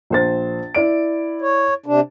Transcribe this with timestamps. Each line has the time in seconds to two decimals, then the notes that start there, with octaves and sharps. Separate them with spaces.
0.10 A#1 C5 A6
0.75 E4 D5 D7
1.42 C#5
1.86 C3 D4